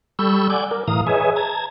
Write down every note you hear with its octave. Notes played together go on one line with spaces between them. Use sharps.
G3 A4 B5 C#6 E6 G6
D5 F#5 G#5 D6 G6
A#4
A2 E3 F5 A#5 D#6
G#4 B4 C#5 D#5 E5 G#5
A5 A#5 G#6